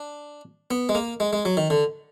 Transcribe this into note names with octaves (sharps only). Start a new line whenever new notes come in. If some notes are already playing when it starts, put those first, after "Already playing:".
Already playing: D4
B3
G#3
A#3
G#3
G#3
F#3
D#3
D3